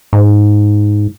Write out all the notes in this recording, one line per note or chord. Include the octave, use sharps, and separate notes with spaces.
G#2